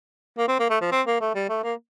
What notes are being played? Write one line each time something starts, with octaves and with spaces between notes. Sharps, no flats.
A#3
C4
A#3
A3
F3
C4
A#3
A3
G3
A3
A#3